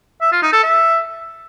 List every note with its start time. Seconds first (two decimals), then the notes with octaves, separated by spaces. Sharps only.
0.21 E5
0.32 F4
0.42 D#4
0.53 A4
0.63 E5